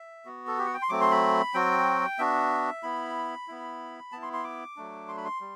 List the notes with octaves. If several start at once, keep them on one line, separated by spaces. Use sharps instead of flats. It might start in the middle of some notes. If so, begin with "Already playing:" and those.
Already playing: E5
B3 F#4
A4
G4
F#5
G5
C6
F#3 A3 C4 D6
C6
B5
F#3 C4 F#4 G5
B3 D4 F#4 E5
B3 E4 B5
B3 E4
B3 E4 A5
C6
C6
D6
F#3 A3 D4
C6
B5
C6
G3